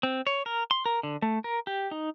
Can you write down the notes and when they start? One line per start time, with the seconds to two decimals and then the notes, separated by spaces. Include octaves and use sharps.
0.03 C4
0.27 C#5
0.46 A#4
0.71 C6
0.86 A#4
1.03 D3
1.22 A3
1.44 A#4
1.67 G4
1.91 D#4